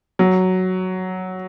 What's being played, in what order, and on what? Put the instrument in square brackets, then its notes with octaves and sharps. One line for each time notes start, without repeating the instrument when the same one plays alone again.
[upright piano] F#3